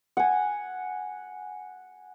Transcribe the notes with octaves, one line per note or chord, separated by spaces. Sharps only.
F#5 G#5